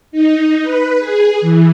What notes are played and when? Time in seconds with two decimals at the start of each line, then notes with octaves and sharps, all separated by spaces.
0.12 D#4
0.63 B4
1.00 G#4
1.41 E3